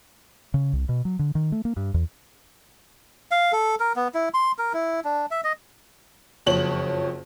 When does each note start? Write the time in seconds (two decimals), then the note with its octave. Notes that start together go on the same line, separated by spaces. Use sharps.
0.54 C#3
0.73 C2
0.89 B2
1.05 F#3
1.19 D3
1.35 D#3
1.52 A3
1.65 A#3
1.77 G2
1.94 E2
3.31 F5
3.52 A4
3.80 A#4
3.96 B3
4.14 E4
4.34 C6
4.58 A#4
4.73 E4
5.05 D4
5.31 E5
5.44 D#5
6.46 F#1 F2 C#5 F#7